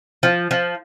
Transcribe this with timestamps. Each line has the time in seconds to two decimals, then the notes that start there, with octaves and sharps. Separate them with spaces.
0.23 F3
0.51 F3